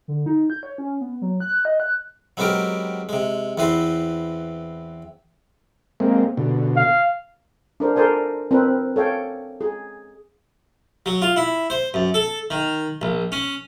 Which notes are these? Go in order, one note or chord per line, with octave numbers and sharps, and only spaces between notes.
D3
D#4
G6
C#5
C#4
B3
F#3
F#6
D#5
F#6
F#3 G#3 B3 C4 G4 A#4
C3 G#3
E2 E3 C4 B4 C6
G#3 A#3 C4
B2 D3
F5
D4 A#4 C5
A4 A#4 C5 D5 G#5
C4 A#4 B4
A4 C#5 F5 G5
G#4
F#3
F4
E4
C5
F#2
A4
D#3
A#1
C#4